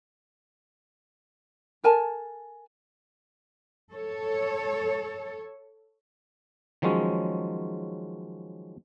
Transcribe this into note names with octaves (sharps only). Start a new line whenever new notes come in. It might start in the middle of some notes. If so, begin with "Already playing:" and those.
A4 A#4 G#5 A5
A4 C#5
D#3 F3 F#3 G#3 C#4